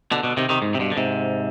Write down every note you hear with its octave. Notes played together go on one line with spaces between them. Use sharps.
B2 D3
B2 D3
C3 D#3
C3 D#3
G#2
C3
G2 B2
D3
G#2 C3